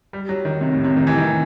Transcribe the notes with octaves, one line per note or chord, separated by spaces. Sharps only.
G3
F#3
D#3
C3
A2
C3
D#3
E3
D#3